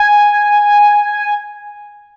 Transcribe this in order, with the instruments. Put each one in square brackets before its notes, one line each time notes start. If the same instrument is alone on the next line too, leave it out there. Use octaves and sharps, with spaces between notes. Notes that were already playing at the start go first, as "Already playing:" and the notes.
Already playing: [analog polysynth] G#5